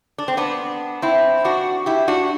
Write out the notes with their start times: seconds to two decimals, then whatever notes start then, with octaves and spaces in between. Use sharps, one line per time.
0.18 D4
0.28 C4
0.37 B3 D4
1.02 C4 E4
1.44 D4 F#4
1.86 E4 G4
2.08 D4 F#4